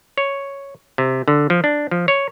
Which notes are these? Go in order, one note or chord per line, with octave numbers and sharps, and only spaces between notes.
C#5
C3
D3
F3
D4
F3
C#5